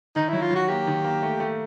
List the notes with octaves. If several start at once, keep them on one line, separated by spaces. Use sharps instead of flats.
D#3 D#4
F#3 E4
F4
F#3 F#4
A#3 G4
D#3
A#3
A3
A3